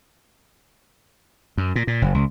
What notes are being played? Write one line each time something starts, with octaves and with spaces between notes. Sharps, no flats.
F#2
A#2
A#2
F#1
C#2